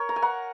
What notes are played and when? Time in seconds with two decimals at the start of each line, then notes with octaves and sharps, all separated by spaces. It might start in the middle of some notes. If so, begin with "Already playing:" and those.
Already playing: A#4 C#5
0.09 A#5
0.16 G#5
0.22 F#5 A#5